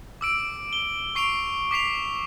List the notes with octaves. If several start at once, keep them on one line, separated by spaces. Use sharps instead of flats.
D6 E6 D7
G7
C#6 C7 D7 F7
D6 B6 C7 F7